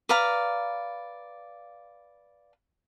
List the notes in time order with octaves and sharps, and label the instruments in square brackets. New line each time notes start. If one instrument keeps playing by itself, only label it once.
[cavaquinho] B4 D5 F5 A#5